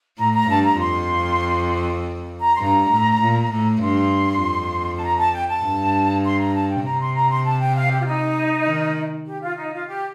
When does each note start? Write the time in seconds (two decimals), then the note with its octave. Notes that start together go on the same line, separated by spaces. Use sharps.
0.18 A2 A#5
0.33 A#5
0.48 G2 A5
0.64 A#5
0.79 F2 C6
2.40 A#5
2.56 C6
2.60 G2 A#5
2.91 A2
3.21 A#2
3.51 A2
3.82 G2 C6
4.42 F2
4.97 A5
5.03 A#5
5.18 A5
5.33 G5
5.48 A5
5.63 G2
6.24 C6
6.39 A#5
6.55 A5
6.70 G5
6.84 C3 A#5
6.99 C6
7.15 A#5
7.30 C6
7.45 A5
7.60 G5
7.75 F5
7.91 G4
8.01 F4
8.05 D#4
8.67 D#3
9.27 G4
9.42 F4
9.57 D#4
9.72 F4
9.88 G4